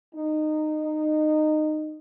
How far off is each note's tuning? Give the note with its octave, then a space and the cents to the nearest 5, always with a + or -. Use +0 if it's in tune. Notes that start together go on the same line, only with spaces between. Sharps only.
D#4 -20